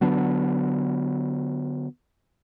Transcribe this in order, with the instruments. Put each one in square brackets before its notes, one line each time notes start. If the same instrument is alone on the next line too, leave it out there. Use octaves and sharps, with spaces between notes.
[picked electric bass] D3 F#3 B3 D4